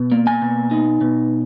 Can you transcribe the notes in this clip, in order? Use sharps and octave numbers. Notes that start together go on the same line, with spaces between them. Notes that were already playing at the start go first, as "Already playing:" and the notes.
Already playing: B2
A#3
G#5
B2
D#4
B2